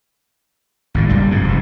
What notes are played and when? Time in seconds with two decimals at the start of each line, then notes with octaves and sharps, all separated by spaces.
0.94 G#1 A#2 C#3
1.09 F#1 G2 G3
1.31 F2 G#2 B2
1.44 F1 G#2